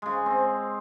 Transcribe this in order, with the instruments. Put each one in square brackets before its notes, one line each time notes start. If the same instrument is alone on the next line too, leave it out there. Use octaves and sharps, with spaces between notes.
[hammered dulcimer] C#3 G#3
C4